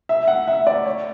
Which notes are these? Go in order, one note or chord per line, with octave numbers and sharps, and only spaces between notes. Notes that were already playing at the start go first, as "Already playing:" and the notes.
E5
F#5
E5
D5
C#5